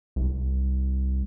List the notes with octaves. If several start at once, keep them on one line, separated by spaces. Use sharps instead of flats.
C2